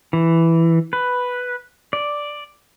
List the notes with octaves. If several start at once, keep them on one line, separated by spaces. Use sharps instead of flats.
E3
B4
D5